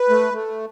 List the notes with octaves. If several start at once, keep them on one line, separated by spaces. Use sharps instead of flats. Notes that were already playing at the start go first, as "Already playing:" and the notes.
Already playing: B4
A3
A3